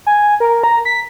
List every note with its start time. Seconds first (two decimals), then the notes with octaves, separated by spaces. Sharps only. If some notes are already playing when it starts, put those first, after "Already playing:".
0.06 G#5
0.40 A#4
0.64 A#5
0.85 B6